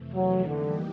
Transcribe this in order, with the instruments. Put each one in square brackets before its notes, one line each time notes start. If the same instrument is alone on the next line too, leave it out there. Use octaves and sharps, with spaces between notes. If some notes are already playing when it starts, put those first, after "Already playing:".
Already playing: [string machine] F2 C3 E3 A3
[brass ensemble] F#3
[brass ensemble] D3 [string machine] E3 G3 A#3 D#4 G4